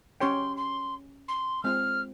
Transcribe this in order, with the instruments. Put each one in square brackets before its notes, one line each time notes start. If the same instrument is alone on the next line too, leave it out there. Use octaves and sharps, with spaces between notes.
[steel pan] C#4 G4 C#5 G5 [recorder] C6
[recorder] C6
C6
[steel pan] G#3 C4 F4 [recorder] F6